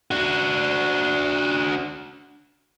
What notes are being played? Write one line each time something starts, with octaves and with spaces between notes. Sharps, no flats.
D4 F#4